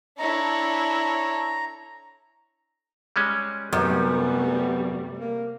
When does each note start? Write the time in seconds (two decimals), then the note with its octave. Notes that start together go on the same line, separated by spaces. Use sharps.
0.19 D4 E4 A4 C#5 A#5
3.16 G3 G#3 C#4
3.73 F#2 C3 D#3 G3 A3 B3
5.19 A#3